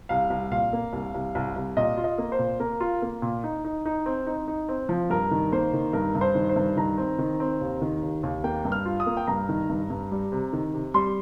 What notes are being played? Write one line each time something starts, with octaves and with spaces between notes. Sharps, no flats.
C2 F5
C2
A#2 F5
A#3
C2
C2
C2
C2
A#2 D#5
F4
D#5
A#3
C5
A#2
A#3 A#4
F4
A#3
A#2
D#4
D#4
D#4
C4
D#4
D#4
C4
F3
G2 A#4
D#3
A#3 C5
D#3
G2 A#4
G2
C5
D#3
C5
G2
D#3 A#5
C4
D#3
C4
D#2
D#3
D#2
D#2
A#3 G5
G2
F6
F4
D#6
A#3
G5
G2 A#5
D#3
G2
G2
G3
C3
D#3
C3
G3 C6